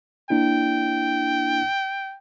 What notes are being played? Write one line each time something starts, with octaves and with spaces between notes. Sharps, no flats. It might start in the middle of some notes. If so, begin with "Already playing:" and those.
A#3 D4 E4 G5